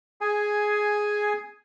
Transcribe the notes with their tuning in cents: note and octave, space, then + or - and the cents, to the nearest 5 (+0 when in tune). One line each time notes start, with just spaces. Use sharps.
G#4 +5 G#5 +0